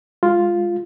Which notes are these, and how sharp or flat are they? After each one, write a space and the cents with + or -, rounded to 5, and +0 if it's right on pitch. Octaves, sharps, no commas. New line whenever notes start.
G#3 -15 F4 +0